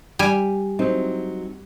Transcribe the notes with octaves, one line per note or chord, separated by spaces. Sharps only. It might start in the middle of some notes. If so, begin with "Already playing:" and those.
G3 G#5
F#3 C4 D#4